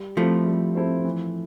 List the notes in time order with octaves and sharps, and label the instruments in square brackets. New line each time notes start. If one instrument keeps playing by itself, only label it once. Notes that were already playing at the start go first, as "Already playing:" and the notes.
Already playing: [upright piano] G3
[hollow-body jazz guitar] F3 A3 [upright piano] C4 E4 A4 C5
[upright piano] G3
C4 E4 A4 C5
E3